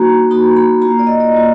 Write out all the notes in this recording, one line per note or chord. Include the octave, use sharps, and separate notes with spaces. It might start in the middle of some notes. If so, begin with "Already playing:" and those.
Already playing: A#3 D#4 F#4 A#5
A#3 D#4 F#4 B5
B5
A#3 F4 A#5
D5
D#5
D5
A#3 F4